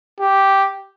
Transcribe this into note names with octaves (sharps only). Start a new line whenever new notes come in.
G4